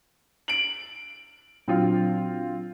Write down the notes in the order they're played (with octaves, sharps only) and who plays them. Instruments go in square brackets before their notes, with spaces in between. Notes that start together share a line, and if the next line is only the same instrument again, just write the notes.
[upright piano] D7 F#7
[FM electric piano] A#2 F#3 D4 [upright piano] C4 F4